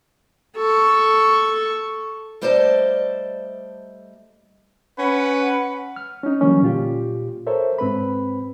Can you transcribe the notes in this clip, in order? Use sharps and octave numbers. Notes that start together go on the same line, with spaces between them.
A4 C#6
G3 A3 C5 D5 D#5 A5
C#4 B4 F#5
F6
C#4 D#4
D3 E3 F#3 G3 A#3 C#4
A#2 F4 G4
A4 A#4 C5 C#5 E5
G#2 C4 B4 B5